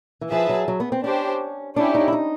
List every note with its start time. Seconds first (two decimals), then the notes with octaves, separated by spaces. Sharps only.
0.21 E3
0.31 F3 G#4 B4 E5 A5
0.49 F#3
0.68 F#3
0.80 B3
0.92 C4
1.04 C#4 D4 G4 C5
1.76 C#4 D4 E4 G4
1.95 D#4
2.08 E4
2.13 D#4